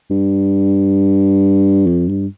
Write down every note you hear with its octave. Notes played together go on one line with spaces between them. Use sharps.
G2
F2
G2